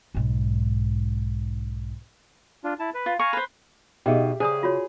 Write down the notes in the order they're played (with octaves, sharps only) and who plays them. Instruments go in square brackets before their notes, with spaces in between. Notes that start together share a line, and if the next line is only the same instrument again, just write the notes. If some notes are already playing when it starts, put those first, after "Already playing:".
[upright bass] B1 G#2
[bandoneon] D4 F4
E4 A5
B4
[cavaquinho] F4
[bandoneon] F5 G#5 A#5 [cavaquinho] C#6
[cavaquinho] B4 C5
[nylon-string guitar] B2 D#4 [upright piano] G4 E5 F5 [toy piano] G#4 G5
[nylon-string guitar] C#3 [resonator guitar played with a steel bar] G#4 [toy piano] C5 D5 D#6
[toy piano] F4 F#4 C#5